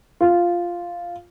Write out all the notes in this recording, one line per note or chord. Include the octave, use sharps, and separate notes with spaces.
F4